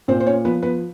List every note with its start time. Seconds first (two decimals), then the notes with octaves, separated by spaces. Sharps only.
0.08 A#2 C4 C5
0.20 C5
0.26 C#4 C#5
0.45 F3 B3 B4
0.63 B3 B4